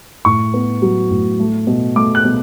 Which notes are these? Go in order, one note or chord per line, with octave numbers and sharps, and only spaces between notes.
A2 C#6
B3
F#3
A2
A3
B2
A3 D6
F#6
B2